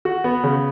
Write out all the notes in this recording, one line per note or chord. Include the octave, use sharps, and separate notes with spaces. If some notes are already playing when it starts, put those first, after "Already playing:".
F#4
B3
C#3